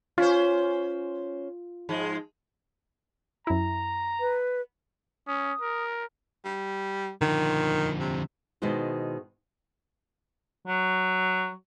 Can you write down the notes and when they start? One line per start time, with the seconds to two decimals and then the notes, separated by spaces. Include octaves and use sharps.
0.18 C#4 F4 C5
1.89 G#2 F3 G#3
3.47 F#2 E4 A#5
4.20 B4
5.27 C#4 D#6
5.61 A#4
6.45 G3
7.21 D3 D#3 F3
8.00 C3
8.62 B2 D#3 G#3 E4 F#4 C5
10.67 F#3